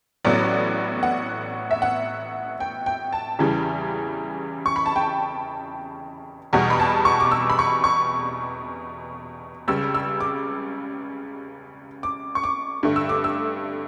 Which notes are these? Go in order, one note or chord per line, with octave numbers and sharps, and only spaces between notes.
A1 A2 F#3 B3 D5
F#5
E5
F#5
G5
G5
A5
E2 C#3 E3 G3
C#6
B5
A5
G5
E2 B2 G3 F#5
B5
A5
C#6
D6
E6
B5
C#6
C#6
C#2 C#3 G3 E6
E6
D6
D6
C#6
D6
G2 D3 A3
E6
D6
E6